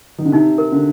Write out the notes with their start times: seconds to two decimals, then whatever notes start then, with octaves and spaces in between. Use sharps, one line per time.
0.18 D#3
0.25 D3
0.32 C3 D#4
0.58 A#4
0.72 D3